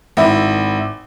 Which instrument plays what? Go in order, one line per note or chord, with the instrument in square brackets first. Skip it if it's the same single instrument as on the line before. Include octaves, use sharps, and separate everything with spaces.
[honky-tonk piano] G#1 E4